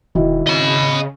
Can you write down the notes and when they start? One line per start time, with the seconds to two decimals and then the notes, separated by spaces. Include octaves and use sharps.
0.15 E1 D#3 E4 F#4
0.47 C#3 D#5 B5